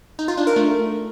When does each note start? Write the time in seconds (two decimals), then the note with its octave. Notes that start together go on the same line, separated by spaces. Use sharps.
0.19 D#4
0.28 F4
0.38 D4
0.47 A#4
0.56 A3